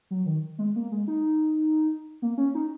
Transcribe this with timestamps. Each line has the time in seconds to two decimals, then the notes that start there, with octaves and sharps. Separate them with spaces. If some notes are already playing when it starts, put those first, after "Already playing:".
0.11 F#3
0.26 D#3
0.59 G#3
0.76 A#3
0.92 G#3
1.08 D#4
2.22 A#3
2.38 C#4
2.55 D#4